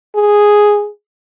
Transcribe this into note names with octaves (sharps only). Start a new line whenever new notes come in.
G#4